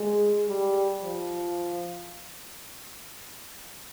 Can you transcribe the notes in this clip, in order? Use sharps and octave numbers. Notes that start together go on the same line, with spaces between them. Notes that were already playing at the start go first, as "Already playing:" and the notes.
Already playing: G#3
G3
F3